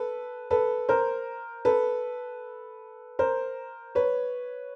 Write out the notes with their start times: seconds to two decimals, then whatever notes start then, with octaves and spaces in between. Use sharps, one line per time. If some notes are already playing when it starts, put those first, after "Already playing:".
Already playing: A4 B4
0.51 A4 B4
0.89 A#4 C5
1.65 A4 B4
3.19 A#4 C5
3.95 B4 C#5